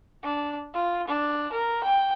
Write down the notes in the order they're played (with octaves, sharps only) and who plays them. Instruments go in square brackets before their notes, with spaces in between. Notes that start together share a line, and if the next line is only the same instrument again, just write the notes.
[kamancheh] D4
F4
D4
A#4
G5